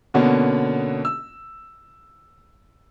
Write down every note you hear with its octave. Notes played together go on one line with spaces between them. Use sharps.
B2 D3 A#3 B3 C#4
E6